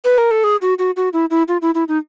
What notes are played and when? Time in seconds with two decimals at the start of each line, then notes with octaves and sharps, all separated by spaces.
0.04 B4
0.18 A#4
0.31 A4
0.44 G#4
0.62 F#4
0.79 F#4
0.96 F#4
1.13 E4
1.30 E4
1.48 F4
1.62 E4
1.75 E4
1.88 D#4